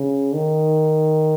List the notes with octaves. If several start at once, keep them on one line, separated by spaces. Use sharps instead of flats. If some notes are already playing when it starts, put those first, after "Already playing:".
Already playing: C#3
D#3